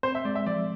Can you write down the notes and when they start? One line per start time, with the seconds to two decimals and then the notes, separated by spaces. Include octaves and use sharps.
0.03 C4 C5
0.15 E5
0.25 G#3 D5
0.35 E5
0.46 F3 D5